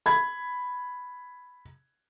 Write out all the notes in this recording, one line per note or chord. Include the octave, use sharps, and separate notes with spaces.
B5 G#6